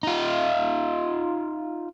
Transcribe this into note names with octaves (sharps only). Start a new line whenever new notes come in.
D#4 F4